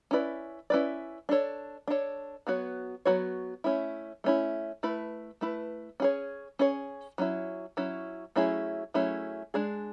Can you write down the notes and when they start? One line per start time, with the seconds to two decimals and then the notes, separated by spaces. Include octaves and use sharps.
0.11 C#4 E4 B4 D5
0.70 C#4 E4 B4 D5
1.29 D4 A4 C#5
1.88 D4 A4 C#5
2.47 F#3 B3 F#4 C#5
3.05 F#3 B3 F#4 C#5
3.64 A3 C#4 E4
4.24 A3 C#4 E4
4.83 A3 E4 B4
5.41 A3 E4 B4
6.00 C#4 G#4 C#5
6.59 C#4 G#4 C#5
7.18 F#3 C#4 E4
7.77 F#3 C#4 E4
8.36 F#3 A3 C#4 E4 G#4
8.94 F#3 A3 C#4 E4 G#4
9.54 G#3 D4 G#4